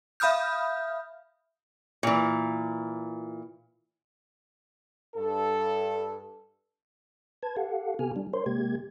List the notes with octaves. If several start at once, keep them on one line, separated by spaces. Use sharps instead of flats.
E5 F5 B5 D#6 F6 G6
A#2 E3
G2 A4
B4 A5 G#6
G4 A4 F5 F#5
C3 B3 G4 A4 G#5 F6
G3 D4
A#4 C5 C#5 C6
C3 G#3 A#3 G4 G#6